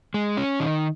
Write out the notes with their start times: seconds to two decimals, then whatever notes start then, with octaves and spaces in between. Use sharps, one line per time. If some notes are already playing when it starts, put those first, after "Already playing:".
0.14 G#3
0.37 C#4
0.60 D#3